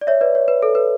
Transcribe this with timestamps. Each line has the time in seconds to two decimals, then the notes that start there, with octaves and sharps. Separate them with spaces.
0.01 D5
0.07 C#5 E5
0.21 B4 D5
0.35 C#5
0.48 B4
0.62 A4
0.75 B4